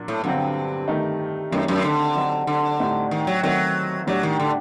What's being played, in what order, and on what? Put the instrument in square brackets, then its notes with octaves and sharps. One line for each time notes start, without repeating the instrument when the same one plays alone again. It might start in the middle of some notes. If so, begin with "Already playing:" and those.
Already playing: [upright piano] A#2 F#3 A#3 D4
[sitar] A2
[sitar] G2 [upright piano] D3 F#3 C4
[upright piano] D#3 A3 D#4
[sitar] F#2 [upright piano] D#3 A3 C4 D#4
[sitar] F#2
D3
[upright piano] F#3 C4 D#4
[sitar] D3
[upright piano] A2 G3 C4 D#4
[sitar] D#3
F#3
[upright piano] D#3 A3 C4 [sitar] F#3
[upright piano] A2 G3 D4 [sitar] F#3
[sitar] D#3
D3